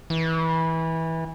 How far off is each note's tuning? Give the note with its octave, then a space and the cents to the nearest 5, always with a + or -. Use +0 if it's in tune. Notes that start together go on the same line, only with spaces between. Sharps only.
E3 -20